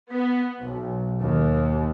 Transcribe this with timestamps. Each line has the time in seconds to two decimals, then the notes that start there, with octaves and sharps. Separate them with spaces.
0.11 B3
0.61 B1
1.21 D#2